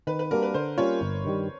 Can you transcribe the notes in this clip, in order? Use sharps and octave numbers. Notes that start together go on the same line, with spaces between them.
D#3 B4
B4
G3 A#3 D4 F#4 A#4
B4
D3 C5
G3 A#3 C#4 F4 C#5
G1
G2 D#3 G3